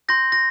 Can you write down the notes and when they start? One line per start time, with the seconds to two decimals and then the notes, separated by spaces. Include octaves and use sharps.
0.09 C6 G6 A#6
0.32 A#6